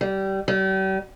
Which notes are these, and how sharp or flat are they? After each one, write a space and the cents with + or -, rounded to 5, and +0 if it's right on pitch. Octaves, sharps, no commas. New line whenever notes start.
G3 -20
G3 -40